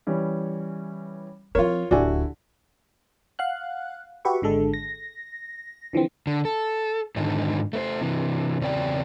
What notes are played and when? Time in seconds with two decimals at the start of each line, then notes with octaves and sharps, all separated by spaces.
0.07 E3 G3 C#4
1.55 F3 C4 F4 A#4 C#5
1.91 D1 D3 E4 F#4 G4 D5 G#5
3.39 F5 F#5 F#6
4.25 F#4 G4 B4 E5 C#6
4.42 G#1 D3 G#3 A4
4.74 A#6
5.93 D3 E3 F3 C4
6.27 D3
6.45 A4
7.16 G#2 D3 D#3 D#4
7.73 A3 B4 C5
8.01 C3 E3
8.61 E2 C#3 C4 D5 G5